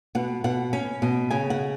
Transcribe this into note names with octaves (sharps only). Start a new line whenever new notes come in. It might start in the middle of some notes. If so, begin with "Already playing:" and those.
B2 F#5
B2 F#5
C#4
B2
C#3 G#5
F#5